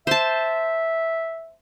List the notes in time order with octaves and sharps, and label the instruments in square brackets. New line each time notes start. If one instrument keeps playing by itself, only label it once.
[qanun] C5 A5 [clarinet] E5